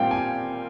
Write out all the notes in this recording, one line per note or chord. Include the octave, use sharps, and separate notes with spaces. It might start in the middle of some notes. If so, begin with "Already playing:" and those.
Already playing: A#2 G3 C4 F4 F5 G5
G#5